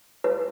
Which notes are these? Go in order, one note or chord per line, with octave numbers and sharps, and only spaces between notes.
B4